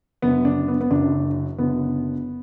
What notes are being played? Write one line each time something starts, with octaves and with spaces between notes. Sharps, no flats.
F#1 F#2 D3 B3
D4
B3
B3
F#1 F#2 D3 D4
F#1 F#2 D3 B3